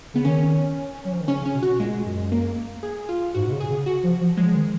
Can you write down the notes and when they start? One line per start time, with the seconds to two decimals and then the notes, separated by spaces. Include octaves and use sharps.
0.14 C#3 B3
0.25 D#3 C#4
1.04 F#3
1.12 F3
1.21 D#3
1.28 C#3 C#4
1.42 C#3 C#4
1.54 B2
1.63 F#4
1.79 A#2 G#3
2.05 F#2
2.32 A#3
2.83 G#4
3.09 F4
3.34 G#2 F#4
3.47 B2
3.52 C#3
3.60 G#4
3.69 C#3
3.86 F#4
4.03 F3
4.21 F3
4.37 F3 G#3
4.50 F3
4.55 D#3